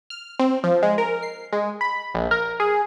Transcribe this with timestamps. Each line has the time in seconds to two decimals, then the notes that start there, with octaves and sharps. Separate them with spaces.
0.10 F6
0.40 C4
0.64 F3
0.83 G#3
0.98 A#4
1.22 C7
1.52 G#3
1.81 B5
2.15 A#1
2.31 A#4
2.60 G#4